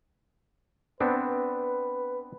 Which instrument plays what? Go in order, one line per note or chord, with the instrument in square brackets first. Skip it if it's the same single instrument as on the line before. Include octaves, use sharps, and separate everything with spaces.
[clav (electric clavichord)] B3 C4 D4 [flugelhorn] B4